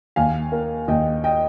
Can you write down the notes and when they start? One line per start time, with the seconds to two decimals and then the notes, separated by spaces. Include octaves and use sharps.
0.16 D#2 F5 G#5
0.52 A#3
0.88 D#2 D#5 G5
1.24 D#5 G5